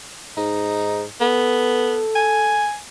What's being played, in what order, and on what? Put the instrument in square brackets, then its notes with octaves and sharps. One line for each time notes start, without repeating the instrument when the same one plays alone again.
[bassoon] G#2 [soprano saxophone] D#4
[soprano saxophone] B3 [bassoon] A4
[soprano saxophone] G#5